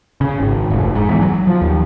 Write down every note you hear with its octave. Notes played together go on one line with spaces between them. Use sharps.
C#3
G#1
F1
G#2
E2
F#3
F3
D#2